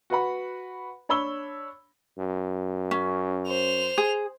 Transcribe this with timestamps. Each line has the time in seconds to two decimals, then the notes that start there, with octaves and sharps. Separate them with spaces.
0.10 F#4 B4 F#5 B5
1.09 D4 C#5 B5 E6 G7
2.18 F#2
2.91 C#4
3.48 C5 F7
3.98 G#4